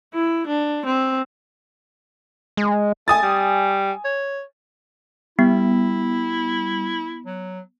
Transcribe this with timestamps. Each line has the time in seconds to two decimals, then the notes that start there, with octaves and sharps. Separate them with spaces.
0.14 E4
0.47 D4
0.86 C4
2.57 G#3
3.08 A3 G#5 D#6 A6
3.22 G3
4.05 C#5
5.39 G3 B3 E4
7.26 F#3